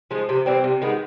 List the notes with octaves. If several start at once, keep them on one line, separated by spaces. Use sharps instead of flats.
F3 G#3
C3
E3 G3 C4
C3
D#3 G#3 B3